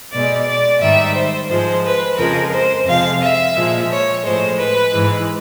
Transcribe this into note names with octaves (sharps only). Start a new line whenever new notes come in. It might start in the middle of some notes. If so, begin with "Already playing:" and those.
B2 G#3 D5
D5
G#2 D#3 G3 E5
C5
G#2 F3 G#3 C5
B4
F2 C#3 F3 G#3 A#4
C5
F2 C3 F3 G#3 F5
E5
A#2 F3 G#3
C#5
A2 F3 G#3 C5
B4
G#2 E3 G#3